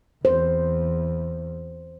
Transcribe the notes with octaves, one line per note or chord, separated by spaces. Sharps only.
E2 C5